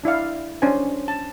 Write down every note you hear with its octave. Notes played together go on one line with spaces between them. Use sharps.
D4 E4 D5 F5
C#4 D4 C5 G#5
A5